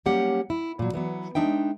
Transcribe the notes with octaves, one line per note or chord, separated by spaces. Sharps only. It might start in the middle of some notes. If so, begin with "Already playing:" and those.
F#3 G3 A#3 C#4 G4 F#5
E4
A#2 F#3
E3 F#3 B3
G#3 D4 D#4 E5 G5